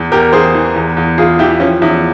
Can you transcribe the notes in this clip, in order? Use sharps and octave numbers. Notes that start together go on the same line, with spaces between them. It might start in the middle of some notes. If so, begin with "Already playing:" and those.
Already playing: E2
E2 G4 A#4
E3 G#4 C5
E3
E2
E2
E3 F4 G#4
E3 E4 G4
F3 C#4
E2 E4